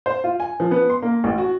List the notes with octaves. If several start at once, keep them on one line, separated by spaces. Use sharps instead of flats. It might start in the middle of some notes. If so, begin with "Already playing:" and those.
C5
F4
G#5
F3
B3
C6
A#3
A1
F#4